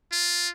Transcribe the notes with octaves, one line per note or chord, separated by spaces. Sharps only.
F4